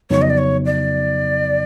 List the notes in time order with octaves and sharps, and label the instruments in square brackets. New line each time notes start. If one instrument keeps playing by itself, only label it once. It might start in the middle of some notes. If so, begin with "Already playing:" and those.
[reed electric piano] F2 C#3 F#3 B3 D#4 [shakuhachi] C#5
[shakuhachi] D#5
D5
C#5
D5